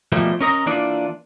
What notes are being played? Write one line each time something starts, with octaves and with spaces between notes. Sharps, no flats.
B2 F3 G3 A3 A#3
C#4 A#4 D#5 A#5
E3 A#3 D4 F4 D5